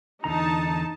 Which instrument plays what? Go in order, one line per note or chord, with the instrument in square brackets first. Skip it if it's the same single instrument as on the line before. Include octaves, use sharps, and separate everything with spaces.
[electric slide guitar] E2 D3 A#5 [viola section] D#4 A5